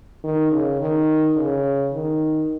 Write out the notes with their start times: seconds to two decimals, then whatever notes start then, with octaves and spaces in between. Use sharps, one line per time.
0.24 D#3
0.51 C#3
0.80 D#3
1.36 C#3
1.93 D#3